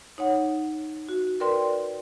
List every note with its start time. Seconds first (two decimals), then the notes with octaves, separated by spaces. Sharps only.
0.18 D#4 C#5 F#5
1.09 F#4
1.40 A#4 B4 D5 G5 C6